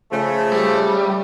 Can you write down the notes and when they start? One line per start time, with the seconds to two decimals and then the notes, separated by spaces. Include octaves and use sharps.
0.12 C#3 F3 A3
0.53 G3